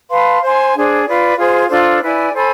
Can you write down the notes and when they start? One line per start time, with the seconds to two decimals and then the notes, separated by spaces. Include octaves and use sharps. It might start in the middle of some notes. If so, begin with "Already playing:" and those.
0.11 B4 F5 A5 C6
0.42 C5 G#5 C6
0.74 D4 G#4 C5
1.05 F4 B4 D5
1.37 F4 G#4 C5
1.69 D4 F4 A4 C5
2.01 E4 B4 D5 G#5
2.33 A4 C5 G#5 B5